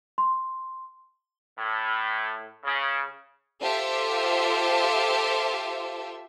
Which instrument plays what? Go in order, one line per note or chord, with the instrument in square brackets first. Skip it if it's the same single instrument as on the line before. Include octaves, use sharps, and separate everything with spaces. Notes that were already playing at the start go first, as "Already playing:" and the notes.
[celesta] C6
[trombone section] A2
C#3
[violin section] F4 G4 A4 C5 E5